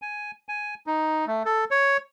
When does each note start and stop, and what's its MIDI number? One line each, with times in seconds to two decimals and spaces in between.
0.02 0.31 80
0.49 0.75 80
0.87 1.25 63
1.27 1.43 57
1.45 1.65 69
1.71 1.97 73